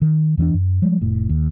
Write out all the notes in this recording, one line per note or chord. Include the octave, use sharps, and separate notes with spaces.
D#3
E2 E3 C4 D4
F#2
F3 G3 G#3
F1 A2
D#2